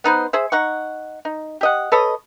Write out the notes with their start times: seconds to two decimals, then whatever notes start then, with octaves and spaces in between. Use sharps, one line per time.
0.04 B3 D#4 B4 C5
0.33 G#4 C5 E5
0.52 D#4 F#5 C#6
1.25 D#4
1.61 G4 D#5 F#5
1.92 A4 B4 C#5 D#5